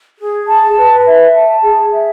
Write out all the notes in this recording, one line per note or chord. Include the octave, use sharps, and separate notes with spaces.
G#4
A5
B4
E5
A5
G#4
E5